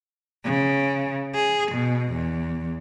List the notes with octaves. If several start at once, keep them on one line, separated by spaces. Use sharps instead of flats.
C#3
G#4
B2
E2